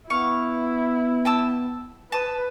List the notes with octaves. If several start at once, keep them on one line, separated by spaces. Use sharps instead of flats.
B3 E4 F5 C#6
G5 A5 E6
B4 A5 D#6